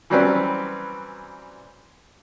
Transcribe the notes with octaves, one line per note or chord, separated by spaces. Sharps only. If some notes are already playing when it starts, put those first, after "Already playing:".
E3 F#3 G3 C4 C#4 B4